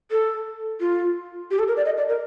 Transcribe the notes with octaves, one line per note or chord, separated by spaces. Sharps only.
A4
F4
G4
A4
A#4
D5
D#5
D5
A#4